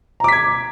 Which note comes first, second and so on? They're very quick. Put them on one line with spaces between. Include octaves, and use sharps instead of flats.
A#5 D6 B6 G#6